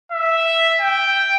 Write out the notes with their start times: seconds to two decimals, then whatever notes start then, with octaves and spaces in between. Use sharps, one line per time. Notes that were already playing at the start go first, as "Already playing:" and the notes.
0.12 E5
0.81 G5